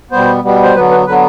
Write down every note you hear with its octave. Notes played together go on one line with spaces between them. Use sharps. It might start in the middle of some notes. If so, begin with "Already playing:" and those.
B2 G3 B3 C5
B2 G3 B3
C5
D3 F#3 B3 B4
B4
D3 F#3 B3 B4